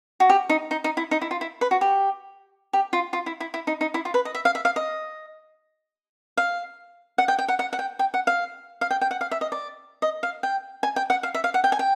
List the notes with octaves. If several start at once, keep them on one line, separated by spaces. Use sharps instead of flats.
F#4
G4
D#4
D#4
D#4
E4
D#4
E4
F4
E4
B4
F#4
G4
G4
F4
F4
E4
E4
E4
D#4
D#4
E4
F4
B4
D#5
E5
F5
E5
F5
D#5
F5
F#5
G5
G5
F#5
F#5
F#5
G5
G5
F#5
F5
F5
G5
G5
F#5
F5
E5
D#5
D5
D#5
F5
G5
G#5
G5
F#5
F5
E5
F5
F#5
G5
G#5
G5